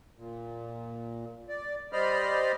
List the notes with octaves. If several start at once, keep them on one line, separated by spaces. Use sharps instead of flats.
A#2
D5
G3 C5 D5 D#5 B5 F6